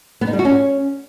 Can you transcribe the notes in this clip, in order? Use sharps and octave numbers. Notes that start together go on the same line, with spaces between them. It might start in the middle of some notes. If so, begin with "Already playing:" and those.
B3
D#4
G3
F#4
C#4